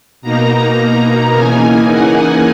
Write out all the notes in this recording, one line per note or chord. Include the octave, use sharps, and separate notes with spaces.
B2 A#3 D#4 A#5
C#3 E3 A#3 D#4 G#5
F#5